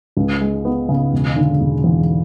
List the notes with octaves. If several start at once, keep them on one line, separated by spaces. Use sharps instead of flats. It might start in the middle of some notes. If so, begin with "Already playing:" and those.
C#2
G#3
B3
C#3
E1
D3
E1
E2